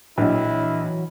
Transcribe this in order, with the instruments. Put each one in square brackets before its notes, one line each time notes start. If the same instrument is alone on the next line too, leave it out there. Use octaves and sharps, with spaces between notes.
[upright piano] A#1 [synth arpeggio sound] E3 F#3 [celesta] D4 D#5 [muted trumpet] E4